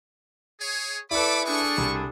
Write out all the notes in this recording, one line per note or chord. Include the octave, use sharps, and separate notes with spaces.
G#4 C#5
E4 A4 B4 D5 B5 C#6 D6
A3 D4 G#4 A4 C#6
C2